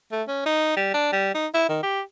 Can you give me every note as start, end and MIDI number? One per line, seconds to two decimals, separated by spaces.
0.12 0.23 57
0.28 0.45 61
0.46 0.73 63
0.76 0.92 55
0.94 1.10 62
1.12 1.32 55
1.34 1.47 63
1.54 1.64 64
1.69 1.78 51
1.83 2.01 67